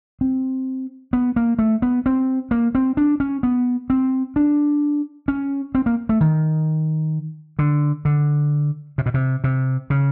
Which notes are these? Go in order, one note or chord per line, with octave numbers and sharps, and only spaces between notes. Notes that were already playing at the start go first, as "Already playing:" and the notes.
C4
B3
A#3
A3
B3
C4
A#3
C4
D4
C#4
B3
C4
D4
C#4
C4
A#3
A3
D#3
D3
D3
C3
B2
C3
C3
C#3